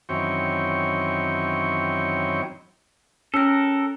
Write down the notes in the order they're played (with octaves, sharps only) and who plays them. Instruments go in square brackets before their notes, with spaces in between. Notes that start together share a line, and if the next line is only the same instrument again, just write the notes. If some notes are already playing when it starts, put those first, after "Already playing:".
[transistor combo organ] F#2 D#3 E3 C4 C#5 G5
[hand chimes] C#4 F#6 [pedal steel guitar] A4 A#4